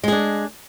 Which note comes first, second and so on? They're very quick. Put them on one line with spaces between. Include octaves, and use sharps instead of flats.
G#3 G#4 D4